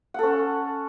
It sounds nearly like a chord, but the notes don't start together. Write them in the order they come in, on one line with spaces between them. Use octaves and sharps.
F#5 A4 C#4